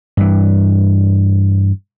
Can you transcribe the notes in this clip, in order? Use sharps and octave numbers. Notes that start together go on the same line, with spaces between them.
G2 E3